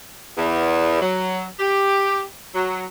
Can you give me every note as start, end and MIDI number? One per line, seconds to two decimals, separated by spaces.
0.37 0.98 40
1.02 1.45 54
1.60 2.22 67
2.55 2.84 54